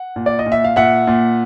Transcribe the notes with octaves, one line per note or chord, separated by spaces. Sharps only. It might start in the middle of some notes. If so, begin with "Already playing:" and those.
Already playing: F#5
A#2
D5
D#5
A#2
E5
F5
A#2 E5 F#5
A#2